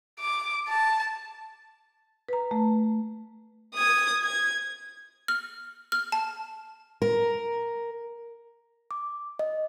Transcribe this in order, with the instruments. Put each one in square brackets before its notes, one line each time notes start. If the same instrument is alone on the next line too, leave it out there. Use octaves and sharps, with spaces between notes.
[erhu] D6
A5
[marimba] B4 A#5
A3
[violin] D#6 G#6
G#6
[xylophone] F6
F6
A5
[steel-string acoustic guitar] A#4
[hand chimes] D6
D#5